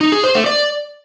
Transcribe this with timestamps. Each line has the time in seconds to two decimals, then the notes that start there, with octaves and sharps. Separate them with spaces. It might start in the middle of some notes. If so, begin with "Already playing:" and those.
0.01 D#4
0.12 G#4
0.23 C5
0.35 A3
0.46 D5